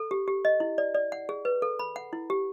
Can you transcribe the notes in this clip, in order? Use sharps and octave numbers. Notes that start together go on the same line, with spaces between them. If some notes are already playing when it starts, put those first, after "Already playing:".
Already playing: A4
G4
G4
D#5
E4
D5
D5
F#5
G#4
B4
A4
B5
F#5
E4
G4